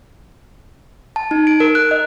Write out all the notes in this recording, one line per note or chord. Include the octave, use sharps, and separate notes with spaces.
A5
D#4
D7
A#4
F#6
D#5